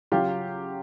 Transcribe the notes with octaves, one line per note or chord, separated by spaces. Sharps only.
C#3 F#3 F4 G4